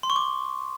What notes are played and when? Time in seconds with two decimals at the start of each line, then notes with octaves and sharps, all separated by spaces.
0.03 C6
0.10 C#6
0.16 D6